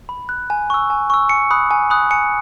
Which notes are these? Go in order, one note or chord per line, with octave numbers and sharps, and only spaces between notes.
B5
F#6
G#5
C#6 E6
G#5
C#6 E6
G#5 C#7
B5 D#6 F#6
G#5
B5 D#6 F#6
G#5 C#7